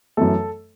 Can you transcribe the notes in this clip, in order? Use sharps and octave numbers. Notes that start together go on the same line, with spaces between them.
F#2 E3 A3 A4